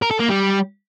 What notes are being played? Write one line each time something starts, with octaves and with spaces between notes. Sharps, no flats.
A#4
A4
A#3
G3